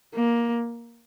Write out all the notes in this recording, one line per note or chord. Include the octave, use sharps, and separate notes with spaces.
A#3